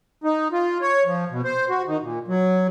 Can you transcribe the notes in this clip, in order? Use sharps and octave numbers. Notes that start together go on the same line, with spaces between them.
D#4
F4
C#5
F3
B2
C5
F#4
D#3
A#2
F#3